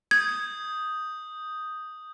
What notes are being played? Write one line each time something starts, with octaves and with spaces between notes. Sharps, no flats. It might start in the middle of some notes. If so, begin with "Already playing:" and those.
D#6 G6 G#6